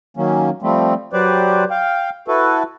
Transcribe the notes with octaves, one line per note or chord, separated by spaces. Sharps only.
D#3 F#3 A#3 C#4
F3 G3 A3 C4
F#3 G4 B4 C5 D5
F5 G5
E4 F#4 A4 B4